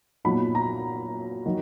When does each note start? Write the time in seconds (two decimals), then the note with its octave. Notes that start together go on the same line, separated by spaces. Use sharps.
0.25 A#2 F#3 B3 D#4 B5
0.55 A#5
1.46 D#3 F#3